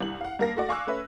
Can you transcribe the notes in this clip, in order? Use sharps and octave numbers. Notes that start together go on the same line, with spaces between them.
C2 G2 F#7
F5 F#5
G2 A#3 A#4 F5 A#6
A3 F#4 D5
F5 G#5 C#6 D6 E6 F#6
A3 C#4 B4 E5